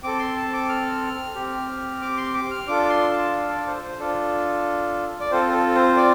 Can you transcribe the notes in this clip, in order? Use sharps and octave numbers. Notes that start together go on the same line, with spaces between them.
C4 A4 D6
C6
A5
D6
F6
C4 G4
D6
C6
D6
F6
D4 F4 A4 D6
C6
A5
D5
C5
C5
D4 F4 A4
D5
C4 F4 A4 C5
C5
A4
C5
D5